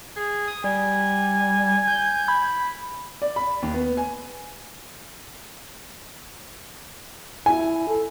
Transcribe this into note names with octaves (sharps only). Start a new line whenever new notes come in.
G#4
D#6
G3 G#5
G6
B5
D5
B5
D#2
B3
G#5
E4 G#5
A4